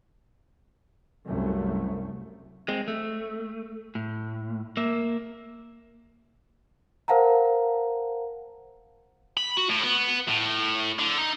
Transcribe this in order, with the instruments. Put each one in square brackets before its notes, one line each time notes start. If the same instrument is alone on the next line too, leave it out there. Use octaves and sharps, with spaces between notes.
[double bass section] C2 F#2 A3
[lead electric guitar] G#3 C4
A3
A2
A#3 E5
[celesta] A#4 C5 F5 F#5 A5 A#5
[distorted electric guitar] B5
F#4
A2
B3
A2
D3
D#4